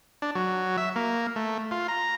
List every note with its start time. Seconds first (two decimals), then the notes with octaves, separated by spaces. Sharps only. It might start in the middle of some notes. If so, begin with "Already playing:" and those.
0.22 D4
0.35 F#3
0.78 E5
0.96 A#3
1.36 A3
1.71 F4
1.88 A#5